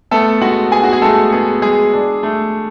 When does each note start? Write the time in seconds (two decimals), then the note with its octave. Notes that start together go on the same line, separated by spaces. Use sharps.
0.11 A3 B3 A4
0.41 G#3 F#4 F#5
0.72 B3 G#4 G#5
0.84 F#4
0.93 G#4
1.02 G#3 A3 A4
1.32 B3 G#4
1.62 G#3 G#4
1.93 D4
2.23 A3